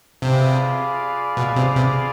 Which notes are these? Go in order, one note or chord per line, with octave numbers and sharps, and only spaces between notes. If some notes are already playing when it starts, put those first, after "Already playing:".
C3 F4 G#4 B4 D5 F5
B2
C3
C3